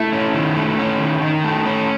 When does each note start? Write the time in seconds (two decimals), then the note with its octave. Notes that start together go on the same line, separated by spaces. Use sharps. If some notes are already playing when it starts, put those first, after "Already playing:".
Already playing: A3 E4
0.13 C#4
0.34 D#3
0.56 A3
0.78 C#4
1.00 D#3
1.22 D#3
1.44 A3
1.66 C#4